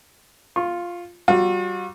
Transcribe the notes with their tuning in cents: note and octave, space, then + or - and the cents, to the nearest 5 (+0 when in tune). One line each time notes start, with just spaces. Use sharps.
F4 +0 C#6 -35
G3 -30 F#4 -45